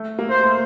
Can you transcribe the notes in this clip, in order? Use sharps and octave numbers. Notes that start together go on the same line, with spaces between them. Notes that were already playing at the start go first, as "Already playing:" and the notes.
Already playing: A3
A#3
C5
A3